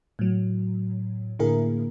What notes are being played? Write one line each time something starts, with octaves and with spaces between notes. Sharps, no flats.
A2 F#3
A2 D3 A#3 E4 G#4 A#4